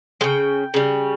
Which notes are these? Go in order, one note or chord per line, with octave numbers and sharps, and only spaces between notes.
C#3 G#3 G5
C#3 G3